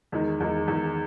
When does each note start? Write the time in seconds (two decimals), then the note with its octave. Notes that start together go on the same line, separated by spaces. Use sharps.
0.12 E2 D#3 G#3
0.40 E2 D#3 G#3
0.68 E2 D#3 G#3